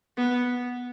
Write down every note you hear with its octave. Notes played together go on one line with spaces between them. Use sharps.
B3